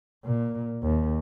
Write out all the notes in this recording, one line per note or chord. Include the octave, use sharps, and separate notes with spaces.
A#2
D#2